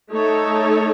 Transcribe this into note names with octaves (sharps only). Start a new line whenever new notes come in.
A3 D#4 A4 C#5